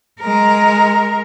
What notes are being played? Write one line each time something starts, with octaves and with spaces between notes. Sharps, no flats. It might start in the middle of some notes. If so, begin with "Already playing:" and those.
G#3 A#4